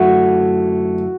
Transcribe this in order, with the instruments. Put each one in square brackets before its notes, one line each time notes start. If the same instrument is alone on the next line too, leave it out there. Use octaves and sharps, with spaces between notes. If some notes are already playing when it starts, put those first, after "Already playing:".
Already playing: [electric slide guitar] F#2 D3 A3 E4 [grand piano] F#4